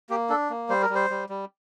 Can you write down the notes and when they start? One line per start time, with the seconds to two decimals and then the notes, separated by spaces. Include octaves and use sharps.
0.10 A#3 G4
0.29 D4 A4
0.50 A#3
0.69 G3 C5
0.82 A#4
0.90 G3
0.95 C5
1.10 G3
1.29 G3